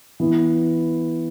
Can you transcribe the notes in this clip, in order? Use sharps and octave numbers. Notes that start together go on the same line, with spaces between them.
E3 B3 E4